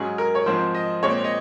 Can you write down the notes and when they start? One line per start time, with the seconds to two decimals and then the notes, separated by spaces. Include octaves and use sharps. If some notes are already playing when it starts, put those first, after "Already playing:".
Already playing: G#2 F#3 C#4 G#4
0.18 A#4
0.35 C#5
0.46 G#2 F3 C4 C5
0.75 D#5
1.03 A#2 G#3 C4 C#5
1.24 D#5